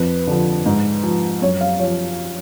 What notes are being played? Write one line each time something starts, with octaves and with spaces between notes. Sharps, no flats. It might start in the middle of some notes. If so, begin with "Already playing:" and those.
Already playing: F2 B4
D3 F3
G#2
F3
F#2 C#5
F5
F3 C#5